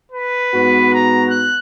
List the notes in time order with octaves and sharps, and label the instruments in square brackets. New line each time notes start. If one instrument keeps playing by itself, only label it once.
[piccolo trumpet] B4
[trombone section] G#2 B3 F#4
[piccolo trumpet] A#5
F#6